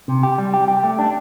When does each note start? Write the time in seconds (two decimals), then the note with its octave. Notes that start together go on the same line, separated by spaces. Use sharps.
0.08 C3
0.23 G4
0.38 G3
0.54 G4
0.68 G4
0.83 A3
0.99 D4